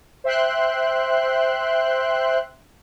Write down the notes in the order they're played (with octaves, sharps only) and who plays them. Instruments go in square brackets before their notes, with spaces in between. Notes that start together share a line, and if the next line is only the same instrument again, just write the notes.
[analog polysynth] C5 E5 G5 C6 F#6